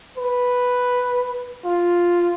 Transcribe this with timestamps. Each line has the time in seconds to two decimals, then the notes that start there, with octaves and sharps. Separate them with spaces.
0.18 B4
1.65 F4